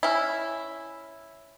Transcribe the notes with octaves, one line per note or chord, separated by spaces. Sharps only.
C#4 E4